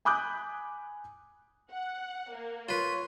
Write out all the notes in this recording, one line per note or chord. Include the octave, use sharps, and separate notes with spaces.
G#5 B5 D6 D#6 F#6 G6
F#5
A#3
F4 B4 C#5 C6